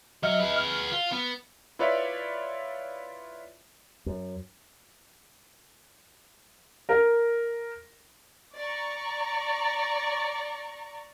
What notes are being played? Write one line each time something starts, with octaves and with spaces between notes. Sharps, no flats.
F#3 D#5 E5 F6
G#4 B4
F6
F4
B3
E4 F4 B4 C#5 D5 E5
F#2
A#4
D5 A#5 C#6